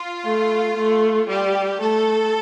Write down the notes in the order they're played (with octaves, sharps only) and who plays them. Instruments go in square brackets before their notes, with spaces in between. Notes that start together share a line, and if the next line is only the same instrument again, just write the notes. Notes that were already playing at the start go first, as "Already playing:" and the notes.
Already playing: [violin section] F4
[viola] A3
A3
[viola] G3 [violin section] G4
[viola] A3 [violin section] A4